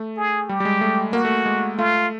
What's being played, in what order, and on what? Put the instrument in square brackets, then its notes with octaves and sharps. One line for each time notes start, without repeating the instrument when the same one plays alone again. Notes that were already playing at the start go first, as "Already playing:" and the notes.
Already playing: [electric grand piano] A3
[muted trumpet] G#4
[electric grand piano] G3 [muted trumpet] G4
[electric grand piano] G3
G#3
A3
[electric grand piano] A#3 [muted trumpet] F#4
[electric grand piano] A3
G#3
[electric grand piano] A3 [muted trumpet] F4